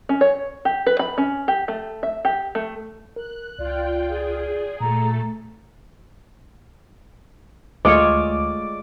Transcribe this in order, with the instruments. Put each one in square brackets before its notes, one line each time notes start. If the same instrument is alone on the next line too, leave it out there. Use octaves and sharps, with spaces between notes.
[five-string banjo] C#4
C#5
G4
B4
B5
C#4
G4
A3
E5
G4
A3
[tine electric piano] A#4 [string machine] F#6
[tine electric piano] C#2 [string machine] F4 G5 [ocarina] D5
[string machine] G#4
[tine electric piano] A#2 [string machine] A3 A4 [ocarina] A#5
[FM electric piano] D2 A3 [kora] G#3 F4 C#5 [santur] D5